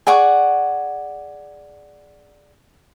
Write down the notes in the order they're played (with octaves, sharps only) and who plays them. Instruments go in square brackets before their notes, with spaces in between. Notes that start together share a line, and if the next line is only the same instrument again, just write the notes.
[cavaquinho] G#4 D5 F#5 C#6